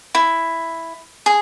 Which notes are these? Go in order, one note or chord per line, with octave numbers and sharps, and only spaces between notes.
E4
G#4